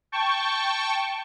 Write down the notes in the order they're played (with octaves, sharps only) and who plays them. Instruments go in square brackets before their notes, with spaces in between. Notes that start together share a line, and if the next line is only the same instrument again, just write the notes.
[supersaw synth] G5 A5 C#6